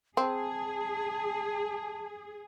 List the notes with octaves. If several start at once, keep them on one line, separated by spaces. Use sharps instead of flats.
C4 G#4 A5